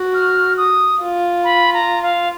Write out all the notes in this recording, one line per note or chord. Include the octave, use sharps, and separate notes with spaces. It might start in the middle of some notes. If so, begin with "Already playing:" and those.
Already playing: F#4
F6
D#6
F4
B5
A#5
F5